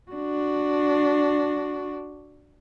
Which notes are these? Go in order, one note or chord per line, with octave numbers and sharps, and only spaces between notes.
D4 F#4